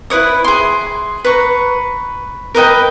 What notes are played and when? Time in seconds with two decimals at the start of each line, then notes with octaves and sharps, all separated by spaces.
0.10 E4 B4 C#5 D#6
0.44 G#4 C6
1.24 B4 A#5 C#6
2.55 A#4 B4 D#5 G5